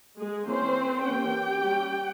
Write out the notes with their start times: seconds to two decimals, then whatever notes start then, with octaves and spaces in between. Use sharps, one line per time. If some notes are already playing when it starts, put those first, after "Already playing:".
0.19 G#3 G#4
0.48 E3 A#3 C4 C#4 C5
1.06 E3 A#3 C#4 G4 G5
1.65 G3 C#4